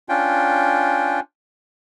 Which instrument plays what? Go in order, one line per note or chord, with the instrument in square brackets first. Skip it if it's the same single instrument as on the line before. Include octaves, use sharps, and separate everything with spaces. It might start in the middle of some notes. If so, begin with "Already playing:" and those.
[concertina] C#4 D4 F4 G5